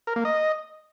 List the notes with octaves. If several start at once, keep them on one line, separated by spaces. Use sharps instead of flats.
A#4
A#3
D#5